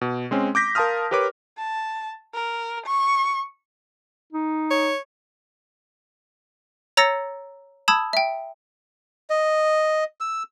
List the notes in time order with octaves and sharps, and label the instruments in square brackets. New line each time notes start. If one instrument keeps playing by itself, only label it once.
[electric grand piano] B2
G#3 C4 C#4
D6 G6 A#6 B6
A#4 F5 A5 C6 D#6 F6
G4 A#4 B4 C#5 D6
[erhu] A5
A#4
C#6
[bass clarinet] D#4
[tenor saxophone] C#5
[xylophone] C#5 A#5 E6 A6 A#6 C#7
A5 B5 D#6 E6 G#6
E5 G5
[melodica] D#5
E6